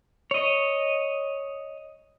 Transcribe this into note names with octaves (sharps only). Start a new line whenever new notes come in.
C#5 D#5